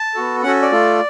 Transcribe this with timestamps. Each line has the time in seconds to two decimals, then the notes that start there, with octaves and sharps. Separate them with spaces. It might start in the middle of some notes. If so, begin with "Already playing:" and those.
Already playing: A5
0.15 B3 F#4 A4
0.43 C#4 F#4 A4 F#5
0.62 D5
0.72 A3 F4 A4